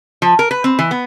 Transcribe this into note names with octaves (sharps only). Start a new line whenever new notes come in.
F3
A#4
B4
C4
E3
B3